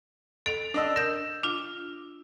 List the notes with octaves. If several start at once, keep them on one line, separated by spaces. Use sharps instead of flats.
A4 D7 F7
D4 D#5 E6
A#4 G6 E7
D4 F4